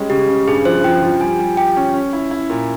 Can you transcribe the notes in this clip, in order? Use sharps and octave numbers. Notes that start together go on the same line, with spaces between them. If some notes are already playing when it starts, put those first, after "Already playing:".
Already playing: G3 G#3 C#4
C#3 G4
C#3
G2 G#4
F3 C5
F3 G5
F3
G3 G#5
G3
G4 G5
C#4
C#4
E4
E4
A#2